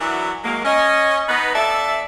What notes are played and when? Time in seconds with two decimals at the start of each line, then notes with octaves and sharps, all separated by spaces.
0.01 E3 F#3 D4 E4 F#4 A#4
0.44 F#3 G#3 A#3
0.65 C#4 D#5
1.29 B3 D#4 B4
1.54 F2 A4 D5 E5